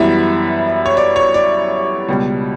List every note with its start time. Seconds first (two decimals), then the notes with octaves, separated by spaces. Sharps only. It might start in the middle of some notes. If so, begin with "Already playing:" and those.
Already playing: F#2 E3 G3 B3 E4 E5
0.86 C#5
0.97 D5
1.16 C#5
1.34 D5
2.08 C#2 B2 G3